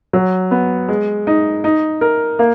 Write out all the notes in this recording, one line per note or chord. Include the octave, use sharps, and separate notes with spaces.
F#3
B3
G#3
D#4
D#4
A#4
A#3